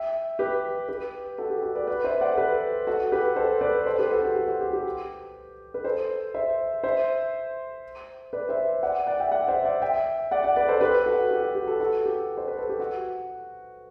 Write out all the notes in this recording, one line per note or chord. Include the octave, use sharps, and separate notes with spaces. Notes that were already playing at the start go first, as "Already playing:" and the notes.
Already playing: E5 G5
G4 B4
G4 B4
F#4 A4
G4
F#4
B4 D5
B4 D5
C5 E5
D5 F#5
A4
G4 B4
F#4 A4
G4 B4
A4 C5
B4 D5
A4 C5
G4 B4
F#4 A4
G4
G4
F#4
G4
G4
B4
A4 C5
C5 E5
C5 E5
B4 D5
C5 E5
D5 F#5
D5 F#5
E5 G5
D5 F#5
C5 E5
D5 F#5
E5 G5
D5 F#5
D5 F#5
B4 D5
A4 C5
G4 B4
F#4 A4
G4
F#4
G4
F#4 A4
F#4 A4
G4
C5
B4
A4
G4
F#4